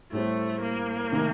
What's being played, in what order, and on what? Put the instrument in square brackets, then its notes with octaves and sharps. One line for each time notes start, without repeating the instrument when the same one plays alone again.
[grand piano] A2 G3 C4 [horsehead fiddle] A3
[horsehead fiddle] A#3
[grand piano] C3 D#3 A3 D#4